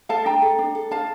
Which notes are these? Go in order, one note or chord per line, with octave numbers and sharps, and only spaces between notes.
A4 F5 A5
D4 G5 A#5
A4
D4
A4
D4 F5 A5